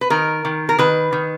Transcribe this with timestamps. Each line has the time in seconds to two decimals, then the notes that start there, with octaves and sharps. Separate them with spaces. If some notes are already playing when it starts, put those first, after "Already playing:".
0.01 B4
0.10 D#3 A#4
0.45 D#3
0.69 A#4
0.78 D#3 B4
1.12 D#3